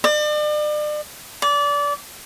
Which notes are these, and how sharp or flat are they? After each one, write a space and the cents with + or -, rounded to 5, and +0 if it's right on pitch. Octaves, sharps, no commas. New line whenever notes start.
D5 +40
D5 -25